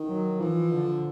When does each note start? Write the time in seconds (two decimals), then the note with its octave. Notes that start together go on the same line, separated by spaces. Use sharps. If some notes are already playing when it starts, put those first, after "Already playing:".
Already playing: D#3
0.08 F#3
0.39 E3 F3
0.72 D3